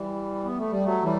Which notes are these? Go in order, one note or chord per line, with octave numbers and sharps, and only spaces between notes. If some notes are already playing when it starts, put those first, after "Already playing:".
Already playing: E3 G3
B3
A3
G3
F#3 A3
E3 G3